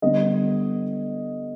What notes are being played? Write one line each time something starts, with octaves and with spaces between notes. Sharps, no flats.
D3 G3 B3 D#5